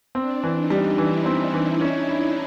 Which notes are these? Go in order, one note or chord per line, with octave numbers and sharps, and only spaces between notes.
C4 D4
E3
D#4
G3
E3 E4
C4
E3
C#4
E4